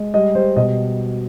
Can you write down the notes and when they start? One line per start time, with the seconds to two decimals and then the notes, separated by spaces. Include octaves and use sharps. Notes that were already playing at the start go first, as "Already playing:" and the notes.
Already playing: G#3
0.14 G3 D#5
0.35 G3 C5
0.56 B2 D#5